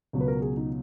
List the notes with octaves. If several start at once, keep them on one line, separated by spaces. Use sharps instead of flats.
C#2 B2 F#3
B4
A#4
G#4
D#4